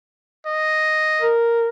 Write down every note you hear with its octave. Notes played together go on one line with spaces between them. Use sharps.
D#5
A#4